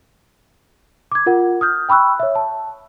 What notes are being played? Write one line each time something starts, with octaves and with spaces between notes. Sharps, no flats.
D6 G#6
F4 A#4 F#5
D#6 F6 G6
G5 B5 C#6 E6 F#6
C#5 E5
A5